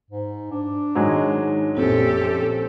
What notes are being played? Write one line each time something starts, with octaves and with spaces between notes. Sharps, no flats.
G#2
D4
G#2 D#3 F#3 G#3
A#1 F#2 A#2 C4 G4 A4